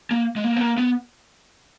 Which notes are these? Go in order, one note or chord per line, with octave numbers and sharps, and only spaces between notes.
A#3
G#3
A#3
B3
A#3
B3